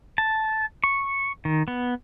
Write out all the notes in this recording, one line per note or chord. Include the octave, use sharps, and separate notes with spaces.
A5
C#6
D#3
B3